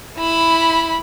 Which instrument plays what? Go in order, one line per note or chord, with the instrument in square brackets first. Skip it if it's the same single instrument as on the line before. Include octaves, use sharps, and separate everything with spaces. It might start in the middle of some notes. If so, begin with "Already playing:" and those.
[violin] E4 B5